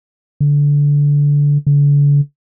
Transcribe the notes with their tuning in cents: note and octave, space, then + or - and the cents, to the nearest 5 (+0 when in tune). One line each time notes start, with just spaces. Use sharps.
D3 -20
D3 -40